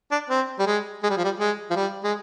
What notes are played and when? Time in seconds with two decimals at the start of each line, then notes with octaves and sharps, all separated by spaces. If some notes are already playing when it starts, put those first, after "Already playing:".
0.12 D4
0.30 C4
0.59 G3
0.67 G#3
1.03 G#3
1.10 G3
1.17 F3
1.24 G3
1.40 G#3
1.71 F3
1.76 G3
2.04 G#3